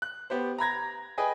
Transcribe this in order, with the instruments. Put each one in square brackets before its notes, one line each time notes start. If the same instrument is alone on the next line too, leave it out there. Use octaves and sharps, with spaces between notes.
[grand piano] F#6
B3 G4 C5
A#5 B5 G#6 A#6
G#4 B4 D#5 G5 G#5